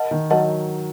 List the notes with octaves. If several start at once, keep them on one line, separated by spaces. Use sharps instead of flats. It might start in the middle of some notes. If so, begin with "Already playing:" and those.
Already playing: A#4 D#5 F#5 A5
D#3
F#3 A#4 D#5 F#5 A5